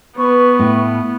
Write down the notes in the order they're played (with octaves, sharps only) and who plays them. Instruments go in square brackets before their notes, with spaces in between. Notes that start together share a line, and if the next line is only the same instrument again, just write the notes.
[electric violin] B3 [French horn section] B4 [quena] C#6
[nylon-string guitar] A2